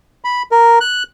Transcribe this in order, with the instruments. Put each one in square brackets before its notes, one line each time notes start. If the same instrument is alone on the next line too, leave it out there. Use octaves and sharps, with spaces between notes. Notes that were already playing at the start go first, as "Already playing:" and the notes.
[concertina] B5
A#4
F#6